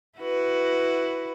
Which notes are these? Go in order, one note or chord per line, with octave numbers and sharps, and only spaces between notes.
E4 F#4 B4